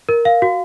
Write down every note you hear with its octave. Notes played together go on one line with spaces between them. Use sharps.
A#4
F5
F#4